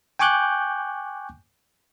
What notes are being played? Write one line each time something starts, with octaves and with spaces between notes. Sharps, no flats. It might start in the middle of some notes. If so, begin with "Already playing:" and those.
G5 G#5 C#6 D6 F#6 G6